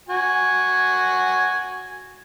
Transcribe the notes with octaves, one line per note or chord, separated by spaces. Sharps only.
F#4 G#5